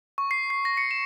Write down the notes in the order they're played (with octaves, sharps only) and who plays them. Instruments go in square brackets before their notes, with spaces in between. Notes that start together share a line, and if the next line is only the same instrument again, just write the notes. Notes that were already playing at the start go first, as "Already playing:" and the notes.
[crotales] C#6
C7
C7
A#6
C#7
E7